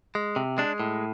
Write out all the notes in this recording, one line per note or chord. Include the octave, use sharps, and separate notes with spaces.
G#3
C3
G#3 D4
A2